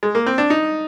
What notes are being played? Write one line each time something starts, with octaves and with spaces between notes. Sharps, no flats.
G#3
A#3
C4
D4
D#4